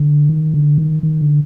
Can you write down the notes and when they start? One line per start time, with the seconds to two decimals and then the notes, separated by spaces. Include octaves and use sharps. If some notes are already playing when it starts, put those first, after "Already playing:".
Already playing: D3
0.29 D#3
0.54 D3
0.78 D#3
1.03 D#3
1.21 D3